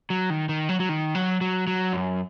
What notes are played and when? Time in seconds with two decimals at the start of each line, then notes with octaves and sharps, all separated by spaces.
0.10 F#3
0.30 D#3
0.49 D#3
0.69 F#3
0.80 F#3
0.89 D#3
1.15 F#3
1.41 F#3
1.67 F#3
1.93 F#2